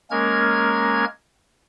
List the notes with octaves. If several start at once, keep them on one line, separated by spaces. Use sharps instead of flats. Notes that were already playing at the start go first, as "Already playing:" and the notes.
G#3 A#3 C#4 A#4 F6 G#6